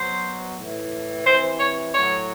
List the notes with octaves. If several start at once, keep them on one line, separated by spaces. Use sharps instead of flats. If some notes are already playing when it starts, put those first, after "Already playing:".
Already playing: B2 F#3 C5
A2 E3
C3 E3 C5
C#5
A2 F#3 C#5